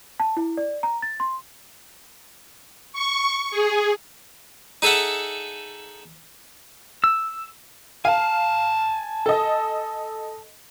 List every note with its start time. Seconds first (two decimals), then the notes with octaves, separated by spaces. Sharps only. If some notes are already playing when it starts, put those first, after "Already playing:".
0.20 A5
0.37 E4
0.57 D5
0.83 A#5
1.02 A6
1.20 C6
2.93 C#6
3.51 G#4
4.82 D#4 G#4 A4 E5 F#5
7.04 E6
8.05 F5 G#5 A5
9.26 A4 D#5